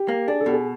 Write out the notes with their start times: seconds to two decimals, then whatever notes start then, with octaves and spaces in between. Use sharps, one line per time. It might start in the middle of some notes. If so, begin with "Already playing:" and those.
Already playing: G4
0.09 A#3
0.27 D4 G#4
0.41 A4
0.46 B2 G4
0.53 G#4